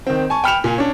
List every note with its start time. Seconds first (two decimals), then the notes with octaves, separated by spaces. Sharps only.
0.07 D#3 C4
0.30 G#5 A5 C#6
0.44 G5 B5 F6 C#7 E7 F7
0.64 A#2 G#5
0.78 C#4 D4